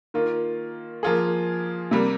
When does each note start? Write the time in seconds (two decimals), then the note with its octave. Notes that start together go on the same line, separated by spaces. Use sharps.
0.14 D#3 A#3 F4
1.03 F3 A#3 F4 G#4
1.91 C3 G3 A#3